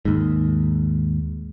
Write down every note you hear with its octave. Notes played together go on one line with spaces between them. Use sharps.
D#2 G#2